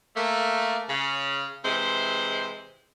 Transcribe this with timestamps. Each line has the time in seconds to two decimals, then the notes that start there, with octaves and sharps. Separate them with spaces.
0.16 A3 A#3
0.88 C#3
1.64 C3 E3 G#3 C5